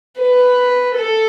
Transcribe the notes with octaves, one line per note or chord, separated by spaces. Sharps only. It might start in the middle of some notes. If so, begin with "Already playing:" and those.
B4
A4